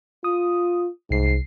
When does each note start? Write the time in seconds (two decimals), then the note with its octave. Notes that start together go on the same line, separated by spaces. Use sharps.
0.24 F4 D#6
1.10 C2 G#2 C7